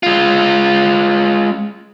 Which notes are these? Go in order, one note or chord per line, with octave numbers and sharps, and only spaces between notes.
G#3 F4